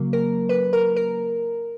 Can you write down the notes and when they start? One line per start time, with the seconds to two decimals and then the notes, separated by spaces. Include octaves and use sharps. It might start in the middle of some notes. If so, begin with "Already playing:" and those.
Already playing: C#3 F#3 A#3
0.13 A#4
0.49 B4
0.73 A#4
0.96 A#4